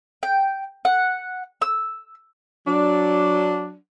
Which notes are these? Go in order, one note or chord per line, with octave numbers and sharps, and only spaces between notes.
G5
F#5
E6
F#3 D4